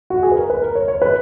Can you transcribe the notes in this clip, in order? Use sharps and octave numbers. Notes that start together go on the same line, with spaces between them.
F#4
G#4
B4
A#4
B4
A#4
C#5
C#5
B4